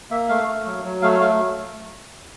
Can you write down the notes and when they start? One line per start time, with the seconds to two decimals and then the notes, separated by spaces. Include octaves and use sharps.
0.11 A#3 E5
0.29 A3 F5
0.48 A3
0.66 F#3
0.84 F#3
1.02 A3 F5
1.20 A3 F5